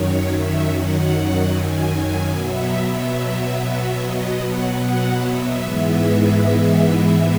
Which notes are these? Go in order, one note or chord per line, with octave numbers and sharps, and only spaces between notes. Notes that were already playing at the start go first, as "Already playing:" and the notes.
Already playing: F#2 D#3 F#3 C#5
E5
F#5
G#5
B2 F#3 B3 E5
D#5
F#5
F#5
E5
G#2 E3 G#3 B3